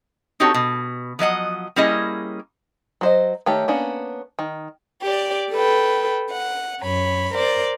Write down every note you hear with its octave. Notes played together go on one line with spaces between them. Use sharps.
C4 D#4 F#4 G4 A4 C#5
B2
F3 F#3 D#5 F#5
G3 A#3 C#4 E4 G#4 D#5
F#3 C5 D#5
D#3 A3 G4 C#5
A#3 B3 C#4 D4
D#3
G4 D5
A4 B4 G5
F#5
F#2 C#5 B5
A#4 C5 D5